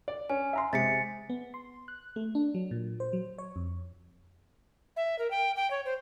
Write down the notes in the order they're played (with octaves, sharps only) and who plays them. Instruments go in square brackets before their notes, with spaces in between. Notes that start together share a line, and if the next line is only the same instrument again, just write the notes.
[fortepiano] D5
[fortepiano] C#4 [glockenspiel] G#5
[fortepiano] E5 A#5 C6
[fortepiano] C3 G#3 [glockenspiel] A6 B6 C#7
[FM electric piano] B3
C6
F#6
A3
D4
F#3
A#2
C5
F#3
C#5
F2
[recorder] E5
A#4
G5
G5
C#5
C5